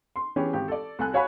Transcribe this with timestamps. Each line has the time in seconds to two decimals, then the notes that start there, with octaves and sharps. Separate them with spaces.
0.16 C6
0.36 E3 B3 C#4 G4 G#4
0.53 G#1 G4
0.68 A4 D5
0.99 C2 A4 G#5 F#6
1.13 F#4 C#5 F5 G#5 B5